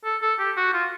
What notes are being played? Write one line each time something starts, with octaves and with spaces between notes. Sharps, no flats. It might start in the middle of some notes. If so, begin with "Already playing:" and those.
A4
A4
G4
F#4
F4